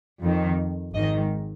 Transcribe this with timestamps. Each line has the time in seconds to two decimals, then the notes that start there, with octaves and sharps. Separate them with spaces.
0.23 F2 D#3
0.94 G#1 G#2 D#3 D#5